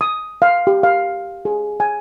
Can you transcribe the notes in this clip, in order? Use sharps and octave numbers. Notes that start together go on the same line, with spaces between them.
D#6
F5
G4
F5
G#4
G#5